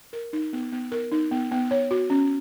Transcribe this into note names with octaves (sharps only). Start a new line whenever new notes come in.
A#4
D#4
B3
B3
A#4
D#4
B3
B3
C#5
F#4
C#4